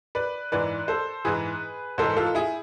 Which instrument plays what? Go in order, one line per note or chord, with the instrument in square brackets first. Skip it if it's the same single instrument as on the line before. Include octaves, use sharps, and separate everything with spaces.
[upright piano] B4 D5
G#2 E3 B4 D5
A4 C5
G#2 E3 G#4 B4
G#2 E3 A4 C5
F4 A4
E4 G#4